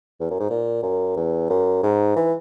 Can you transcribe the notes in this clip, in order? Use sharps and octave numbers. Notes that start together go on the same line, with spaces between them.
E2
F#2
G#2
A#2
F#2
E2
F#2
G#2
E3